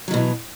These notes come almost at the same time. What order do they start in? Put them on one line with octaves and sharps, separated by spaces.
F#3 D#3 B2 E3